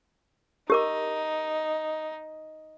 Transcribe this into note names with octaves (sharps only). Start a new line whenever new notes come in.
D#4 G4 A#4 D6